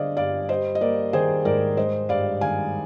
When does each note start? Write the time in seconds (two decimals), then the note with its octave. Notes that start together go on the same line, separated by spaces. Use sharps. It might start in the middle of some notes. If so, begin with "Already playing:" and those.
Already playing: D3 G3 A#3 G#4 C5 D5 D#5 F5
0.17 G2 D5 F5
0.49 G3 C5 D#5
0.75 D#5
0.81 A#3 A#4 D5
1.13 D#3 G#4 C5
1.45 G#2 A#4 D5
1.77 G#3 C5 D#5
2.09 G2 D5 F5
2.41 D#3 F5 G#5